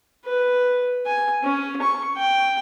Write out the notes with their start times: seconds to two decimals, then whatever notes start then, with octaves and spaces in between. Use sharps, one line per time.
0.25 B4
1.06 G#5
1.43 C#4
1.82 C#6
2.17 G5